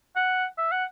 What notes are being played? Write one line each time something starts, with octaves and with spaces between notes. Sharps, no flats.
F#5
E5
F#5